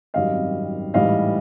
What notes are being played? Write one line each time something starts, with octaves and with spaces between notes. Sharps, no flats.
G#1 F#2 D#3 G3 C4 D#5 F5
A1 G#2 E3 G3 D#5 F5